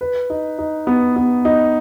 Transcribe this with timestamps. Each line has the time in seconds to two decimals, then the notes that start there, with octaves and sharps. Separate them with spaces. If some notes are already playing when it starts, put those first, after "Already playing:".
0.01 B4
0.30 D#4
0.58 D#4
0.87 B3
1.16 B3
1.45 D#4